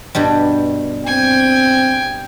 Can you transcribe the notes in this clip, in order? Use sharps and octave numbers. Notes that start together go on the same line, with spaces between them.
G2 B2 G3
C4 G5 G#5